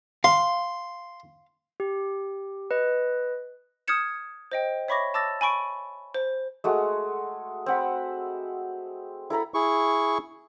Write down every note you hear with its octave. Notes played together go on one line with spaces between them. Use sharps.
F5 C6
G4
B4 D#5
D#6 F6 G6 G#6 C#7 E7
C5 D#5 G5
C#5 E5 B5 C#6 D6 A#6
A5 D6 E6 A6 A#6
G#5 B5 C#6 D7
C5
G#3 A3 F#4
C4 F#5 B5
E4 A4 A#5 B5
E4 G#4 C#6